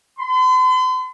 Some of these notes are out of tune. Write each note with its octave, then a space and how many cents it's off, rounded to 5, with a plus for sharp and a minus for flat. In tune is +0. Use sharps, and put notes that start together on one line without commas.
C6 -45